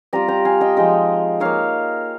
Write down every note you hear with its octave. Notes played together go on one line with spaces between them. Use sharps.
G3 C4 F4 G5 A#5
G5 A#5
F5 G#5
D#5 G5
F3 G#3 D#4 D#5 G5
A#3 D#4 C#5 F5